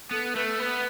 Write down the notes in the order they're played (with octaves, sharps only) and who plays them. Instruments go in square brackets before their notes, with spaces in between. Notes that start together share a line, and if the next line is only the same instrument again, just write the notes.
[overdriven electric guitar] B3 [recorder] A4
[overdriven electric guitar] A3 [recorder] B4
[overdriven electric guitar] B3 [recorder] B4